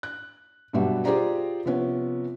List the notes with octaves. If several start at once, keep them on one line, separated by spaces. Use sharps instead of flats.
F#6
G2 B2 F#3 G3 E5
F4 G4 G#4 C5 D5 A#5
C3 F3 B3 C#4